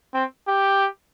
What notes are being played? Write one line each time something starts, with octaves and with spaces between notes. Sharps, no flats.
C4
G4